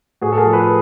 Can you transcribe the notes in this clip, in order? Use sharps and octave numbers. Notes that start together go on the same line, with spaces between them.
A2 F#4 G#4
A4
G#4 A#4
F3
A4 B4